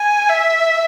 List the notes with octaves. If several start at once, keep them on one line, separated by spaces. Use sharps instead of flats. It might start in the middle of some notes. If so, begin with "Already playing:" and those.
Already playing: G#5
E5